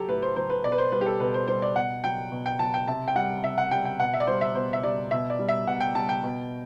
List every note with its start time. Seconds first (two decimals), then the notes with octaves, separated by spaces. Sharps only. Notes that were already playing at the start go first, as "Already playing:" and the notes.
Already playing: F#3 G4 A4
0.08 A2 B4
0.22 C5
0.36 F#3 C5
0.50 B4
0.64 B2 D5
0.72 B4
0.78 C5
0.92 G3 B4
1.01 G4
1.06 A4
1.20 B2 B4
1.34 C5
1.47 G3 C5
1.62 D5
1.76 B2 F#5
2.04 F#3 G5
2.32 B2
2.46 G5
2.59 F#3 A5
2.74 G5
2.88 C3 A5
3.08 G5
3.15 G3 F#5
3.44 C3 E5
3.58 F#5
3.71 G3 G5
3.85 G5
4.00 B2 F#5
4.14 E5
4.20 D5
4.27 G3 C5
4.41 E5
4.55 B2 C5
4.73 E5
4.83 G3 D5
5.11 B2 E5
5.30 D5
5.39 G3
5.48 E5
5.67 B2 F#5
5.80 G5
5.95 G3 A5
6.09 G5
6.24 B2